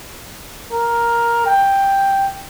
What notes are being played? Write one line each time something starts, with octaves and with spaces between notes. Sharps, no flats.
A#4
G5